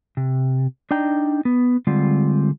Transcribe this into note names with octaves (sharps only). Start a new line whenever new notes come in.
C3
D4 D#4 G5 A#5
B3
D3 G3 G#3 C4 F4